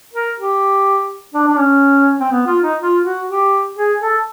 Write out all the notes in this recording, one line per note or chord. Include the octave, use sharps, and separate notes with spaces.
A#4
G4
D4
D4
C#4
C4
B3
F4
D#4
F4
F#4
G4
G#4
A4